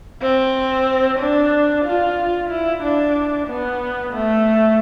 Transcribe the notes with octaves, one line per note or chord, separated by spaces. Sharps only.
C4
D4
F4
E4
D4
B3
A3